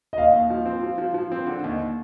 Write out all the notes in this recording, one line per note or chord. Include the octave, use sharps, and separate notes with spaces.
D#5
D#2 F5
D#2
F3
C4
F3
F3
F3
C4
D3
D#2